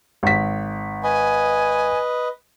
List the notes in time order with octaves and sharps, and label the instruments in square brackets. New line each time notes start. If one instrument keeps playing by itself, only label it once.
[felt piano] G#1 B6
[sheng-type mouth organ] B4 D#5 [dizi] G#5